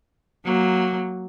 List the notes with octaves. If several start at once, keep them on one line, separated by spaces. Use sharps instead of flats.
F#3 A#3